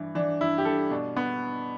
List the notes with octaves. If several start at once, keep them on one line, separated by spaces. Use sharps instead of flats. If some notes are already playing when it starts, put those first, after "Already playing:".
Already playing: G2 E3
E3 D4
G2 E4
G4
G2 A4
B2 D4
B3